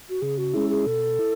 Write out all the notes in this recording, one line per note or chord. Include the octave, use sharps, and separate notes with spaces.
F#4
C#3 G#4
F#4
G#3 C#4 E4 G#4
G#4
B2 A4
E4